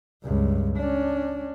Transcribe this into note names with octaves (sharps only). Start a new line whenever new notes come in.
C#2 G2
C#4 D4